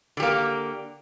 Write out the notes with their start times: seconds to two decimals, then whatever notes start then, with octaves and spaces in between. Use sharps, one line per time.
0.17 D3
0.20 G4
0.22 A#3